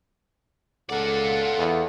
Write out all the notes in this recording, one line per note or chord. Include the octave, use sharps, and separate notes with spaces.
C#2 F4 A4 D5 F#5
E2